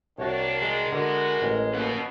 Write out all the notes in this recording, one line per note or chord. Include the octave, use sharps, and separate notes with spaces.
C2 D#3 A#3 D4 F#4 C#5
G#3 G#4
E2 D3 F#4 A#4
A1
B2 A#3 C#4 F#5